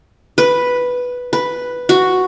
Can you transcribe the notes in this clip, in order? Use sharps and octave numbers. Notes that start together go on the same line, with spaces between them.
B4
B4
F#4